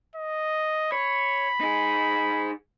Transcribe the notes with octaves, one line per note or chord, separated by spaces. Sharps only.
D#5
C#5 B5
D#4 G#4